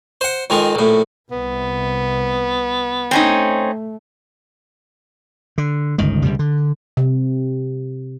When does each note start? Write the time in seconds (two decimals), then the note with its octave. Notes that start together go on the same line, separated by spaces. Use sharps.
0.21 C5 F#5
0.50 F2 D#3 G#3
0.75 A#1 A2
1.31 C2 C3 B3
3.11 A3 C4 C#4 D#4
5.58 D3
5.98 G1 C#2 D#3
6.23 C#2 C3 G3
6.39 D3
6.97 C3